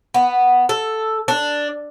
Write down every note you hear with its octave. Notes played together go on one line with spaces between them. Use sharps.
B3
A4
D4